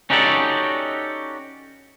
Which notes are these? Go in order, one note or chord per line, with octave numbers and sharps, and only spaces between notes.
C#4 D#4 F#4 G4 A4 D5